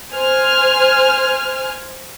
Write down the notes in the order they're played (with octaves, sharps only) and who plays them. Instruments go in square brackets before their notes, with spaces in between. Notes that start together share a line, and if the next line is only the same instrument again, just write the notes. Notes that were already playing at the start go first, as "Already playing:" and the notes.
[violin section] C5 G#5 F6